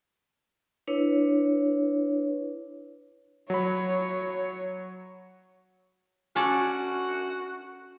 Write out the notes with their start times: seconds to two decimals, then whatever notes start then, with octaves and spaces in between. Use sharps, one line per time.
0.88 D4 E4 B4 C#5
3.50 F#3 C#5 B5
6.36 C#4 F#4 A4 D5